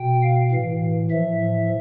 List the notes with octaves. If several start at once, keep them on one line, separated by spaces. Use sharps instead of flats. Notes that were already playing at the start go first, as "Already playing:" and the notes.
Already playing: B2 G5
F5
A2 E3
A2 F3 E5